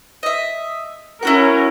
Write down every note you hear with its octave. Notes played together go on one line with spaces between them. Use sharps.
D#5 E5
C#4 E4 F#4 A#4 F#5